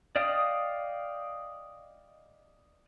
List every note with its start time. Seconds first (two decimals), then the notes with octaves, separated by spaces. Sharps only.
0.16 D5 D#5 F5 G5 D#6